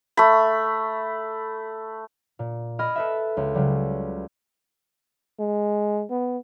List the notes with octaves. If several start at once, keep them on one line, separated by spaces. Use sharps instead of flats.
A3 B5
A#2
D#5 B5 D#6 F6 G#6 D7
A4 B4 E5
C#2
C#3 F#3 G3
G#3
B3